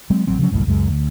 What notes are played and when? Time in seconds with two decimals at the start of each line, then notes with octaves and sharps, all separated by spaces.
0.10 F#3 G#3 C4
0.27 A1 F#3 C4
0.39 C#3 F3 F#3 C#4
0.51 G1 C2 F#2 A2
0.67 C#2 F#2 G#3
0.88 D2